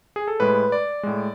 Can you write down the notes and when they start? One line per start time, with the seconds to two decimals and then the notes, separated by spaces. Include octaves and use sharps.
0.16 G#4
0.28 A4
0.40 A2 G#3 B4
0.72 D5
1.03 A2 G#3